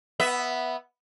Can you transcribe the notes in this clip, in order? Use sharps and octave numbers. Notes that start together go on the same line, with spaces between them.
B3 E5